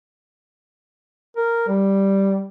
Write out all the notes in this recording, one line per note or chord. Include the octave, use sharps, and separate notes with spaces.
A#4
G3